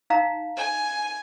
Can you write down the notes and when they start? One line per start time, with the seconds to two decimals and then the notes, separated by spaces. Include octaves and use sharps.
0.10 D#4 F5 A#5
0.57 G#5